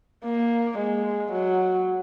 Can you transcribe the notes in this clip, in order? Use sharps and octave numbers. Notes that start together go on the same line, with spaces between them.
A#3
G#3
F#3